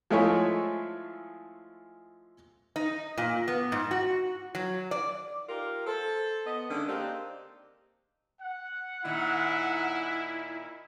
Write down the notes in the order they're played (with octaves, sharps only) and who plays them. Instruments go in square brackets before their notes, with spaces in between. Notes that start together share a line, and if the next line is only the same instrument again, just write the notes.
[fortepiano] F3 G#3 A3 E4 G#4 C#5
[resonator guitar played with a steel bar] D#4
A#2
B3
G#2
F#4
F#3
D5
[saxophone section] D#4 F4 G4 A#4
A4 C5
B3 D#5
D3 D#3 G#3 A#3 C#4 D4
A#3 C4 D4 D#4 G4
[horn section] F#5
[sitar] A#2 D#3 [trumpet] E4